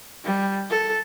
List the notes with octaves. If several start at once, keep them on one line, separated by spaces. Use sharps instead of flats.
G3
A4